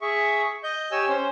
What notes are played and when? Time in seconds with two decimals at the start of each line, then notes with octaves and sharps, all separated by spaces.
0.01 G#4 E5 C#6
0.64 D#5 G6
0.92 G4 C#5 G#5 E6
1.09 C#4 C5